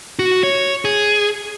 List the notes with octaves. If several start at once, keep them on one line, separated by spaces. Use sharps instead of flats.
F#4
C#5
G#4